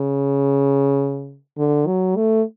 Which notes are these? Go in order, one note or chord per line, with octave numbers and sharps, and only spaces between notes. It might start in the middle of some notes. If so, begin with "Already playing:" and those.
Already playing: C#3
D3
F#3
A3